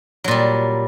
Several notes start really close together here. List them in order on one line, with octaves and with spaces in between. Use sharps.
F#3 A#2 G3